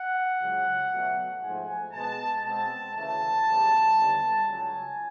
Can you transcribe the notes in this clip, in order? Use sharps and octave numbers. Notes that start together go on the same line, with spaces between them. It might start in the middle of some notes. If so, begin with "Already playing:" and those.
Already playing: F#5
C#2 C#3 F#3
B2 F#3 A3
G#2 F3 A3 G#5
B2 G#3 B3 A5
B2 G#3 C4 A5
D2 C#3 E3 A3 A5
F#2 C#3 E3 G3 B3
D#2 D3 G3 B3
C#2 C#3 F#3 G#5